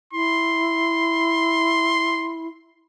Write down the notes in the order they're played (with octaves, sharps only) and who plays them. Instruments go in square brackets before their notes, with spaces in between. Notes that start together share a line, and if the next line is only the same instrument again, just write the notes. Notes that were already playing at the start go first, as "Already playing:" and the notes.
[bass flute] E4 [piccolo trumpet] C6